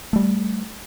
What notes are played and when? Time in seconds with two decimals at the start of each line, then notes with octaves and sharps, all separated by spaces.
0.13 G3 A3